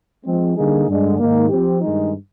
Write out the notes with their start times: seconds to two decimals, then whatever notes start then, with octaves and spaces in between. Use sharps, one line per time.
0.25 F3 G#3 C4
0.56 D3 G3 A#3 D#4 G#4
0.88 G2 D3 G#3
1.18 G#2 D#3 A#3
1.49 F3 C4 G4
1.81 G2 D#3 G#3 D#4